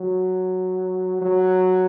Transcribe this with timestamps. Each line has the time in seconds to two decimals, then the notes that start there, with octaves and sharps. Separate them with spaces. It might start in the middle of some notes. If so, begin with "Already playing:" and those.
Already playing: F#3
1.22 F#3